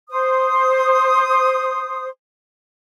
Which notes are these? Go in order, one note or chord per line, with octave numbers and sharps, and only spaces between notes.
C5 D#6